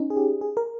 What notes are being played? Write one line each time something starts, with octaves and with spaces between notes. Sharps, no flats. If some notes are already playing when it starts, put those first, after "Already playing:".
Already playing: C#4 D#4
G#4
G4
G#4
A#4